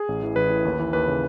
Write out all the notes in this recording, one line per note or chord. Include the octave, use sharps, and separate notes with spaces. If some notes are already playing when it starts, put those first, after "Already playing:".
Already playing: G#4
A1
E3
A1 B4
A2
D#2
E3
D#2 B4
C#3